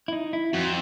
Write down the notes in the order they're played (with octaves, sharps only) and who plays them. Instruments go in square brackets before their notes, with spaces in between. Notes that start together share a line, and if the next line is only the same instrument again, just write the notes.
[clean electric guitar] E4
D#4
E4
[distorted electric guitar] F2 [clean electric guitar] F#4